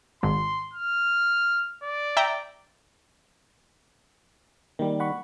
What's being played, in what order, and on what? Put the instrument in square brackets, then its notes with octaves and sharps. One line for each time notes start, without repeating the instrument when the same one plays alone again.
[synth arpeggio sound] G#1 [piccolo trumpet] C6
[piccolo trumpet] F6
D5
[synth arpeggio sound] E5 G5 A#5
[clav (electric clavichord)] D#3 G3 [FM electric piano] A#3
[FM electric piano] F#5 B5 C#6